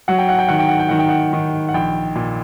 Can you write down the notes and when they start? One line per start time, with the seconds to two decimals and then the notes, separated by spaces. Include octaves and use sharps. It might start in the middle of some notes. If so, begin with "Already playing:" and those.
0.08 F#3 F#5
0.19 G5
0.29 F#5
0.39 G5
0.49 D#3 F#5
0.59 G5
0.69 F#5
0.79 G5
0.89 D#3 F#5
0.99 G5
1.09 F#5
1.33 D#3
1.69 F#5
1.74 A#1 G5
2.15 A#2